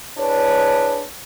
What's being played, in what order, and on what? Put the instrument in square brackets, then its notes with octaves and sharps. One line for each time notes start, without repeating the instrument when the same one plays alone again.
[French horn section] D4 E4 G#4 B4 C#5